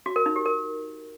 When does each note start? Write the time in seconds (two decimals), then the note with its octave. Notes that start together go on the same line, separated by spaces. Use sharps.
0.06 F#4
0.16 A#4
0.26 D#4
0.36 G4
0.46 A#4